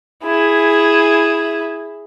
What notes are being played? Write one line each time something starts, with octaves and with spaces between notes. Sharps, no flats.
E4 G#4